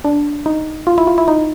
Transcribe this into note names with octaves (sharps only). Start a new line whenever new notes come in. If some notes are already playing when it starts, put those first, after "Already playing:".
D4
D#4
F4
E4
F4
E4
D#4